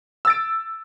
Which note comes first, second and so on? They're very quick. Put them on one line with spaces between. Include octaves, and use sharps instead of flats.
E6 A6 D7